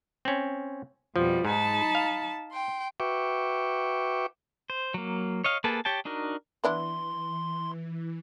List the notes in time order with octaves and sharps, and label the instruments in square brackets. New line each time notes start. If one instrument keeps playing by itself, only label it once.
[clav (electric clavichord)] C4 C#4
[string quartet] F2 B2 G3 [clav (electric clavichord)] F3
[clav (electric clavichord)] G#2 [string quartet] D#4 A5 B5
[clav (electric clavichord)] F5
[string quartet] G5 C6
[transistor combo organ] F#4 B4 E5 G5 C#6 D6
[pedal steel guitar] C5
F#3 A#3
C#5 D#5 F5
A#3 G#4 A4 B4 A5
G4 C#5 G5 A5
D4 D#4 F#4 A#4
[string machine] E3 [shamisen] B3 D4 E4 [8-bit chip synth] C6